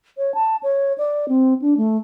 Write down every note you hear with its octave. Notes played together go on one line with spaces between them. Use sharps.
C#5
A5
C#5
D5
C4
D4
A3